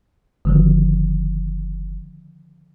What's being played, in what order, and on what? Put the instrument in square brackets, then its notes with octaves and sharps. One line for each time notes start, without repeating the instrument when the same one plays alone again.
[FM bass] F#1 [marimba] D3 D#3 F3